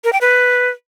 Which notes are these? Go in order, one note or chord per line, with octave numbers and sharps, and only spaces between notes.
A#4
G5
B4